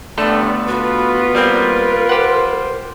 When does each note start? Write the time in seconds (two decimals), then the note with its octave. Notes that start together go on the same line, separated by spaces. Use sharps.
0.18 A1 G2 D3 A3 B3 A4 D5
0.68 F4 F#4 B4
1.35 G3 A#3 C4 A#4
2.09 G4 C5 F#5